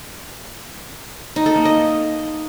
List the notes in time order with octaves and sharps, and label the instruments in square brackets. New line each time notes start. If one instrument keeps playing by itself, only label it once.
[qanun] D#4
A4
A#3
D#5